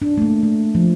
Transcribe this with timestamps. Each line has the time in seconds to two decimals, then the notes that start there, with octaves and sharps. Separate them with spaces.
0.02 D4
0.18 A3
0.22 A#3
0.43 A3
0.75 F3